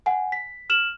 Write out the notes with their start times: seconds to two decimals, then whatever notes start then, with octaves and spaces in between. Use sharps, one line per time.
0.06 F#5 G#5
0.32 B6
0.70 F6 E7 F#7